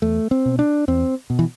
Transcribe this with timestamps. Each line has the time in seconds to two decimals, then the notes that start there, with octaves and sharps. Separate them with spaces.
0.02 E2 A3
0.31 C4
0.45 B2
0.59 D4
0.88 E2 C4
1.30 B2
1.39 E3